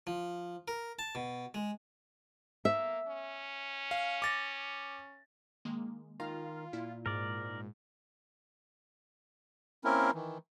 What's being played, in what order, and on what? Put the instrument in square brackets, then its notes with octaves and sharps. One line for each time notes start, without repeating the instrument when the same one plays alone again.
[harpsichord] F3
A#4
A5
B2
G#3
[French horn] A#3 [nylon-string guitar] E5
[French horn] C#4
[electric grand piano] F5
D6 A6 A#6
[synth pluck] D#3 G#3 A#3
[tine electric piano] D#3 A#5 [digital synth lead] F4 [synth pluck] F5
[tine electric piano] A#2 [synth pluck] E4
[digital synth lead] G#2 [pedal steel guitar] A#4 D5
[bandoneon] A#3 C4 C#4 E4 A#4
D#3 E3